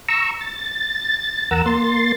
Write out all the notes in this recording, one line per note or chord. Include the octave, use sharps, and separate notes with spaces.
A#5 C#6 E6
A6
E2 A#4 F#5 A#5 E6
A#3 C6 A6